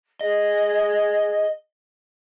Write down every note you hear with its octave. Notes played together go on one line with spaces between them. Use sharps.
G#4 D#5